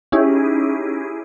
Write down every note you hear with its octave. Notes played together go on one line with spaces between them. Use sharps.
C#4 D#4 E4 G4 G#4